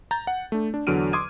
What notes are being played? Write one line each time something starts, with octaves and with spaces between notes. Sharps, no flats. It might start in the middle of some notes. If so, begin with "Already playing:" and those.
A#5 G6 A6
F#5
A3 D4
D4
E2 D3 F#3 F6 D7 D#7
C6 D6 D#6 G#6 D#7